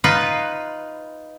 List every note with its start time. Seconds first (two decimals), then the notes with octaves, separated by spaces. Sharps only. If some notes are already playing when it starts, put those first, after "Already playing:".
0.04 D#4 F4 B4